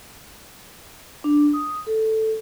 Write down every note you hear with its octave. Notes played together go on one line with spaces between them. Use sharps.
D4
D#6
A4